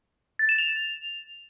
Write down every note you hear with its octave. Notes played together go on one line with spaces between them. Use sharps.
A6
E7
F7